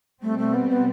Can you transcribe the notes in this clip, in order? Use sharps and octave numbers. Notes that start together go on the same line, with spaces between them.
B2 G3 A3 C4
A3
B3
B3